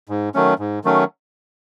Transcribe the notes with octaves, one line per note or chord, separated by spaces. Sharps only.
G#2
D#3 F#3 A3 C#4
G#2
D#3 F#3 A3 C#4